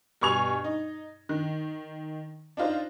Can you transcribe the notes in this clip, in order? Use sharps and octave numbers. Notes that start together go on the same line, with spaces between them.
G2 B2 G#5 C#6 G#6 F7
D#4
D#3
D4 D#4 F4 C5